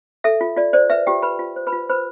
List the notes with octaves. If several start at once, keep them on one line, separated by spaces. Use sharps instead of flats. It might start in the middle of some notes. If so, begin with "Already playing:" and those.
A4 E5
F4
F4 D5
C5 D5
B4 E5
F4 G4 G5
B4 B5
F4
C5
B4 B5
F4
B4 C5 B5